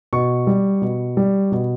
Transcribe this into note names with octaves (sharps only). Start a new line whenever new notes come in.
B2 C#6
G3
B2
G3
B2